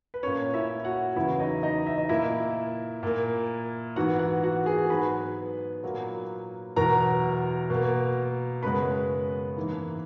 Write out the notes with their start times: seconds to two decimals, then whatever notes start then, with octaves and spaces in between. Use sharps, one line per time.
0.14 B4
0.23 A#2 A#3 C#4 C#5
0.54 E4 E5
0.85 F#4 F#5
1.16 E2 C#3 F#3 B3 E4 E5
1.40 D#4 D#5
1.63 D#4 D#5
1.87 E5
1.98 D#5
2.09 A#2 A#3 E4 E5
3.03 A#2 A#3
3.96 G#2 E3 B3 F#4 F#5
4.19 F#4 F#5
4.44 F#4 F#5
4.66 G#4 G#5
4.90 G#2 F#3 B3 B4 B5
5.83 A#2 F#3 A#3
6.76 E2 B2 F#3 A#4 A#5
7.70 B2 A#3
8.63 F#2 C#3 G#3 B3 B4 B5
9.56 G#2 E3 A#3